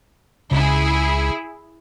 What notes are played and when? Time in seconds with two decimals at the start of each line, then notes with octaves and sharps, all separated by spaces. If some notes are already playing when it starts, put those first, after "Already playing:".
0.51 C#2 C#3 E4 G#4